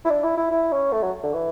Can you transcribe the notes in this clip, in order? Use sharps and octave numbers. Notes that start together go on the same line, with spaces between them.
E4
D4
E4
E4
E4
C#4
A3
F#3
D3
E3